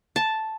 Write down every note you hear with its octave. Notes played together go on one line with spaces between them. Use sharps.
A5